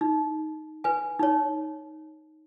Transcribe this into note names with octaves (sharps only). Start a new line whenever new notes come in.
D#4
B4 G#5
D#4 C#5